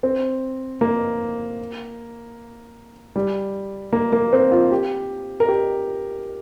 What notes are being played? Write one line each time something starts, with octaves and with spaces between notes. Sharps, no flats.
C4
A#3
G3
A#3
A#3
C4
F4
G4
A#4
G4